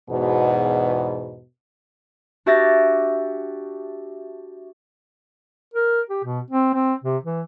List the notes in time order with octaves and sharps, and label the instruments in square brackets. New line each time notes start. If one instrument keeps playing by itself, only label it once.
[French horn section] E2 G#2 B2
[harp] D4 F#4 G4 E5 A6 A#6
[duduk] A#4
G4
B2
C4
C4
C3
E3